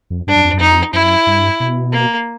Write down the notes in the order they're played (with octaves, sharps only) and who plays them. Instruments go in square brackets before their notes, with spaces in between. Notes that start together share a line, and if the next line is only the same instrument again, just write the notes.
[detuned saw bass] F2
[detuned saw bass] G2 [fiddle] D4
[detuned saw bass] F#2
F2
F#2
[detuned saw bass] F2 [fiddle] D#4
[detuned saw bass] F#2 [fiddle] E4
[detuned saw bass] G2
B2
[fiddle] A#3